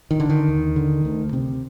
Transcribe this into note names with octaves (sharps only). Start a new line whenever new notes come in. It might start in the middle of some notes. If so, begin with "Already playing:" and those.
D#3
D3
D#3
D#2
D3
D2
C3